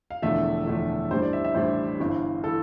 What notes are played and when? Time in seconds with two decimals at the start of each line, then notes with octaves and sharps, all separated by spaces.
0.10 F5
0.22 E1 E2 D3 F3 A3 E5
0.66 E1 E2 D3 F3 A3
1.11 A1 A2 G3 D4 C5
1.22 D5
1.33 E5
1.45 E5
1.54 A1 A2 G3 D4 C5
2.00 G1 G2 E3
2.44 E3 A4